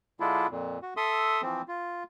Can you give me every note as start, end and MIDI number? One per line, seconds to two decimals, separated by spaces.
0.20 0.47 50
0.20 0.47 56
0.20 0.47 62
0.20 0.47 64
0.20 0.47 65
0.50 0.79 41
0.50 0.79 46
0.83 0.94 66
0.97 1.42 69
0.97 1.42 76
0.97 1.42 84
0.97 1.42 87
1.42 1.62 52
1.42 1.62 53
1.42 1.62 60
1.68 2.03 65